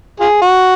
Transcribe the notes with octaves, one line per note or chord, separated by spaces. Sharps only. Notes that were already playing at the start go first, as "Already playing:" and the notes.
F4 G#4
F#4